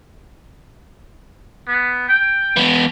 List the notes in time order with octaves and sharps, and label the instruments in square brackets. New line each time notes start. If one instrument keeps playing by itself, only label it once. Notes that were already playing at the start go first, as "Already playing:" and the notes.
[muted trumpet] B3
G5
[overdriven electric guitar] B2 E3